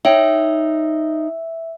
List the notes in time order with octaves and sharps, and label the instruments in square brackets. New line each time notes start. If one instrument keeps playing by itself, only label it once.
[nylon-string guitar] D#4 C#5 G5 [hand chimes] E5